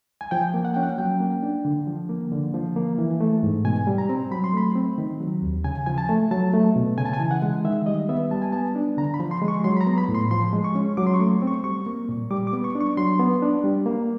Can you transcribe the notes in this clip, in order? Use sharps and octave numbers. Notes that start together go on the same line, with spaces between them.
G#5
F3 G5
A#3
F#5
C#4 G5
F#5
F#3 G5
A#3
D4
D3
F3
A#3
D3
F3
A#3
E3
A3
G#2
B2 G#5
G3
A#5
C4
F#3 B5
C6
A3 B5
C4
D#3
F#3
D#2
C#3 G#5
F3 G#5
A5
A3
F#3 A5
A3
B2
C#3 G#5
A5
G#5
E3
F#5
G#3
D#3 E5
G3 D#5
B3 E5
G3 A5
G#5
B3 A5
D4
D3 A#5
B5
F3
C6
G#3
C#6
F#3 C6
B5
A#5
B3
B5
A2
C6
F3 C6
G#3
C#6
C#4
F#3 D6
C6
C#6
A3
C4
C#6
G3 C#6
A#3
A#2
G3 D6
D6
B3
C#6
D4
C#6
F#3 C6
B3
D4
G3
A#3